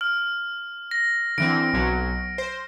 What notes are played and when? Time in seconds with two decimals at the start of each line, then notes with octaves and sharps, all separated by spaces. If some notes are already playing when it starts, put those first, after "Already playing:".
0.01 F6
0.91 A#6
1.38 D3 E3 C4 D7
1.73 B1 F#3
2.38 C5